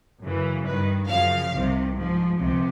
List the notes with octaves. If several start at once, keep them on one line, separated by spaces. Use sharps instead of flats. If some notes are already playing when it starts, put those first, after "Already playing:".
F#2 C#3 E3
G2 D#3 B4
F#2 C#3 F3 F5
C2 C3 D#3
G#2 F3
C#2 C3 F3